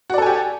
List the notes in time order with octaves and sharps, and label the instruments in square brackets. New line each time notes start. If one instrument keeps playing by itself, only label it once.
[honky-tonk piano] F#4
D5
A4
G#5
G4